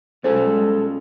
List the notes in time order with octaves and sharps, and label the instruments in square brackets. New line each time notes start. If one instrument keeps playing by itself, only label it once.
[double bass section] B1 G3 G#3 [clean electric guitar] C#4 F4 G#4 [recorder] A4 [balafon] C5